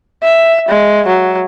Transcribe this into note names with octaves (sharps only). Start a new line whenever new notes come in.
E5
G#3
F#3